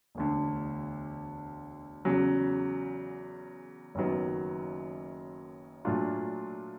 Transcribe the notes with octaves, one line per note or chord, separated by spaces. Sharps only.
E1 D2 D3
E2 C#3 F#3
F#1 F#2 D#3 F#3 B3
A#2 F#3 A3 D4 F4